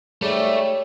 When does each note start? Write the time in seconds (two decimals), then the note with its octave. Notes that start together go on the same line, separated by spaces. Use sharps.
0.22 G#2 G3 A3 C#5